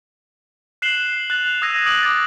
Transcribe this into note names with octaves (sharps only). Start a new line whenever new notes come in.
F#6 C7 E7 F#7 G7
F#6 A6 F7
D#6 E6 G#6 A#6 D#7 E7
D6 D#6 D7 F#7
D6 G#6 A6